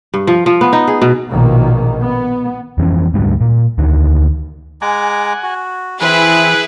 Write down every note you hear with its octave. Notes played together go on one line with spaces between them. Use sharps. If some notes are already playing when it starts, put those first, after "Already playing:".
G2
F3
F3
B3
D#4
G#4
B2
A#1 B2 D#3 A#3
B3
F2 E3 B3 C#4
D2 G#2 G3
A#2
D2 D3 D#3
G#3 F#5 G#5 A#5 D6
F#4
E3 C4 E4 G#4 B4